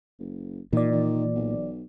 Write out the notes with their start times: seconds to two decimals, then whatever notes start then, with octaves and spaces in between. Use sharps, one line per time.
0.20 F#1
0.73 A#2 D#3 E3 D5
0.92 D#3
1.34 B1